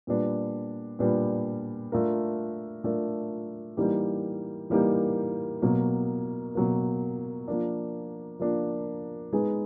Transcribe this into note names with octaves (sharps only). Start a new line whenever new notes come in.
A#2 G3 B3 D4
A#2 G3 B3 D4
A3 D4 F4 A#4
A3 D4 F4 A#4
E3 G3 A#3 D#4 G4
E3 G3 A#3 D#4 G4
B2 F#3 A#3
B2 F#3 A#3
F3 A#3 D4
F3 A#3 D4
G#3 B3 D#4 G#4